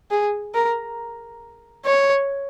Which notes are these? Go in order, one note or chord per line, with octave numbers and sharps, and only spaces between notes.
G#4
A#4
C#5